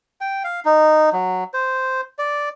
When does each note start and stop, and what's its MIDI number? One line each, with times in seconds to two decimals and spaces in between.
0.21 0.43 79
0.44 0.60 77
0.65 1.10 63
1.13 1.44 54
1.54 2.01 72
2.19 2.49 74